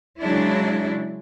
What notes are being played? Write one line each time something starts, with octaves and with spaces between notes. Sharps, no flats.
C#3 F#3 G#3 D4 E4